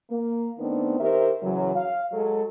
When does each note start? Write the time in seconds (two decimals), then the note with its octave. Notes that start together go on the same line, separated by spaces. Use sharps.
0.10 A#3
0.59 D#3 A3 B3 C4 D4 D#4
0.99 D#3 G4 A#4 C5 E5
1.43 F#2 C#3 E3 F#3
1.76 F5
2.13 F#3 G#3 F#4 A4